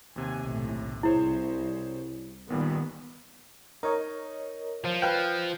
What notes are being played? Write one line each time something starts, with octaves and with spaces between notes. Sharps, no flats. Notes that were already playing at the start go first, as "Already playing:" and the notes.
D#2 C3 F#5 G#5
B1 A2
C2 E4 G#4 C5 C#5
G#1 A#2 D#3 G3 B3
D#4 A#4 C#5 D#5
F3
B4 F5 G5